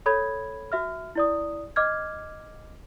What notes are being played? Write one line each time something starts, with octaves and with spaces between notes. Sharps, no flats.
A4 C#5 B5 G#6
F#4 E5 F6
E4 D5 D#6
D#5 D6 F6 G#6